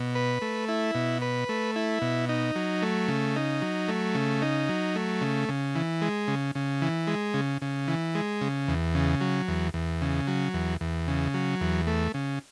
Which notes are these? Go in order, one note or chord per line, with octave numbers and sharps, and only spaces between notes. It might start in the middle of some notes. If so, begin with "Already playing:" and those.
Already playing: B2
B4
A3
E4
B2
B4
A3
E4
B2
D#4
F#3
A3
C#3
D#4
F#3
A3
C#3
D#4
F#3
A3
C#3
C#3
E3
G#3
C#3
C#3
E3
G#3
C#3
C#3
E3
G#3
C#3
E2
C#3
F#3
E2
E2
C#3
F#3
E2
E2
C#3
F#3
E2
A3
C#3